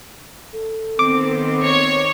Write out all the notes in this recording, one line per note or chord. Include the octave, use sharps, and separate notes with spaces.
A4
D#3 B3 C4 D6
C#5